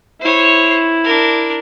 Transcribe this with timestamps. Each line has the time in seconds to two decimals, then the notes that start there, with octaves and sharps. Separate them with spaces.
0.21 E4 C5 C#5
1.04 D4 A#4